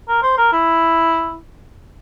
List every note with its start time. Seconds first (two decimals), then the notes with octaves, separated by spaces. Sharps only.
0.08 A#4
0.23 C5
0.38 A#4
0.53 E4